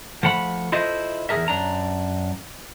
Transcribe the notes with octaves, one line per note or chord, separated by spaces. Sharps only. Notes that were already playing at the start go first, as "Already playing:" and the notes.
F3 A3 F#5 B5
E4 F4 A4 C5 D#5 E5
E2 E3 G#4 A#4 E5
F#2 D4 A#5